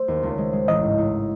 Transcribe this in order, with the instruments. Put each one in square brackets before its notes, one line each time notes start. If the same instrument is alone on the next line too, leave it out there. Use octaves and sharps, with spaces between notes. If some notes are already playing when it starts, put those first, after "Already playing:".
Already playing: [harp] A3 [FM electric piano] C5
[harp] D#2
C#2
G#3
G#3
[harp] A1 [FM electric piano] D#5
[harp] G#2
A1